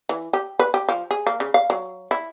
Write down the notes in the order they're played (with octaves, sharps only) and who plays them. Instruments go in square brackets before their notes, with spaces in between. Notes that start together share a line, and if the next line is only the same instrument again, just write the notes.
[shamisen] E3
G4
B4
G4
F3
G#4
A#3
C#3
F5
F#3
E4